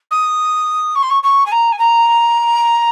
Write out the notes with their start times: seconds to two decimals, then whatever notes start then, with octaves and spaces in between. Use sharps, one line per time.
0.11 D#6
0.95 C#6
1.02 C6
1.10 C#6
1.23 C#6
1.46 G#5
1.52 A#5
1.72 G#5
1.79 A#5